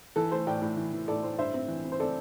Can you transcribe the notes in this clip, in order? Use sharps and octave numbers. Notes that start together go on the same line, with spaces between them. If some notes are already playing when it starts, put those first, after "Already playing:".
E3 A4
A3 C5
A2 D5 G5
A2
E3
E3
A2 A4 D5
A2 C5
G2 C5 E5
C4
E3
C4
C5
C4 A4 D5